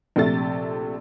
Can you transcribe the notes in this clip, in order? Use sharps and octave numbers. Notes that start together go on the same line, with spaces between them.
A#1 C3 A3 A6